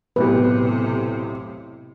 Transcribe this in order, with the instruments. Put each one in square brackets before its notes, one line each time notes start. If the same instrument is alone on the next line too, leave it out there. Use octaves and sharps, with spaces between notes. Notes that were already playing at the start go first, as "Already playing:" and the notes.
[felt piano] B1 A2 G4 [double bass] C3 [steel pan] B4